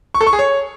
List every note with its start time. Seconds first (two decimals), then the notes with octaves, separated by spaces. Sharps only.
0.14 C#6
0.21 A4
0.27 C#6
0.33 G#4
0.39 C#5